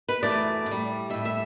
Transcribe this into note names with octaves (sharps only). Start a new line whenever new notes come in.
B4
F#2 E3 A3 D5
A2
G3
A2 G3 E5
E5